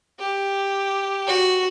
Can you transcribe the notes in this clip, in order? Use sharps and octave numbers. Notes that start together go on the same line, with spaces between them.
G4
F#4